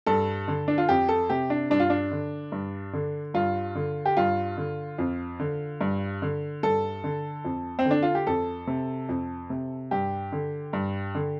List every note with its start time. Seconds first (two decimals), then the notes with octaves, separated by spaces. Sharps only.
0.06 G2 A4
0.48 D3
0.68 D4
0.78 F4
0.89 F2 G4
1.09 A4
1.30 C3 G4
1.50 D4
1.70 G2 D4
1.80 F4
1.90 D4
2.11 D3
2.52 G2
2.93 D3
3.34 G2 F4
3.75 D3
4.06 G4
4.17 G2 F4
4.57 D3
4.98 F2
5.40 D3
5.81 G2
6.22 D3
6.63 G2 A4
7.04 D3
7.45 F2
7.79 C4
7.85 D3
7.91 D4
8.03 F4
8.15 G4
8.27 F2 A4
8.67 C3
9.09 F2
9.50 C3
9.91 G2 G4
10.32 D3
10.73 G2
11.15 D3